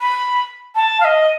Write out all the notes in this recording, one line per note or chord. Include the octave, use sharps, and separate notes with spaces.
B5
A5
F5
D#5